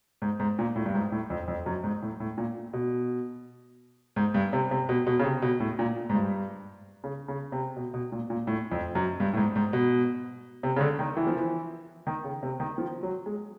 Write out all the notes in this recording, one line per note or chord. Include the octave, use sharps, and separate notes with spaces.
G#2
G#2
A#2
A2
G2
G#2
A2
F2
F2
F#2
G#2
A2
A2
A#2
B2
G#2
G2
C3
C3
B2
B2
C#3
C3
B2
A2
A#2
G#2
G2
C#3
C#3
C3
B2
B2
A#2
A#2
A2
F2
F#2
G2
A2
G#2
G#2
B2
C3
C#3
D3
D#3
E3
F3
E3
D#3
C#3
C3
D#3
F3
F#3
G#3